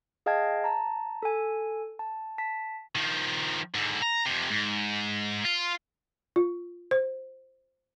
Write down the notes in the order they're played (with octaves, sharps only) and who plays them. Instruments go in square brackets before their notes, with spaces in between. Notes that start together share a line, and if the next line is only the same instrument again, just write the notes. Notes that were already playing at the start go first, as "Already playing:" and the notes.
[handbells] G#4 D#5 F5 G5 A5 G#6
A5 A#5
A4 G#5
A5
A5 B6
[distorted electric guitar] D#3 F3
G#2 D3
A#5
F2 C3
G#2
F4
[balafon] F4
C5